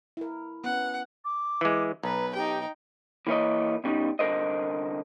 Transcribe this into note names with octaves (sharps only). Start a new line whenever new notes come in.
E4 A#4
B3 C#4 F#5
D6
E3 G#3
B1 B4 A#5
D#4 G4 G5
E3 A#3 E4 C#5 D#5
B2 G3 C#4 D#4
C2 D3 A#4 C5 D#5